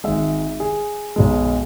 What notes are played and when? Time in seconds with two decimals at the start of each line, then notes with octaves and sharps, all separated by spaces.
0.04 G#1 G#2 G#3 E5
0.60 G#4
1.16 B1 B2 G#3